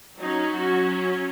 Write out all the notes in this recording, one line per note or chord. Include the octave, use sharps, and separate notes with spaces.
F#3 C#4 D#4
F#4